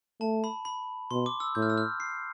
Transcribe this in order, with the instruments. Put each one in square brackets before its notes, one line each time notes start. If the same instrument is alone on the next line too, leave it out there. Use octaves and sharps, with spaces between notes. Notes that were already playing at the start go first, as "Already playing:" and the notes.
[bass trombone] A3 [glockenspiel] A5
[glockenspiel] B5
B5
[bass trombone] B2 [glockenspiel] C6
[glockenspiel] D6
E6
[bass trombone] A2 [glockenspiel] G6
[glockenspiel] F6
E6
F6
C7